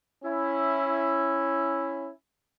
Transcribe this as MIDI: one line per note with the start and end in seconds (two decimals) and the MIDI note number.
0.24 2.09 61
0.24 2.09 64